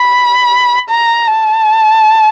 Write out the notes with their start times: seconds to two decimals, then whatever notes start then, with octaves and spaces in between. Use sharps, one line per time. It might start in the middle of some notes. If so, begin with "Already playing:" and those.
Already playing: B5
0.90 A#5
1.27 A5